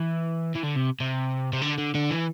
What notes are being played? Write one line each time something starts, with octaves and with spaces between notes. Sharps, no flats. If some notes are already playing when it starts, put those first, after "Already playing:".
Already playing: E3
E3
D3
C3
C3
C3
D3
D3
D3
E3